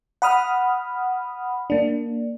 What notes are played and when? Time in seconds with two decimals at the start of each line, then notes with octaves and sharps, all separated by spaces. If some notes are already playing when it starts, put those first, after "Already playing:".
0.22 F#5 B5 D#6 F6
1.70 A#3 D4